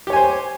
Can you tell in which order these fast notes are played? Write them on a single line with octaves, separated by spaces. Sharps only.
G4 C#5 G#5 C5